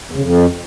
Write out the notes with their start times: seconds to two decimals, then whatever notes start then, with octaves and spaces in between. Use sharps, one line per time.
0.11 E2
0.17 C#3
0.22 F2